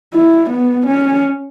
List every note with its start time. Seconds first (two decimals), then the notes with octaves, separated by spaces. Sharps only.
0.14 E4
0.50 B3
0.87 C#4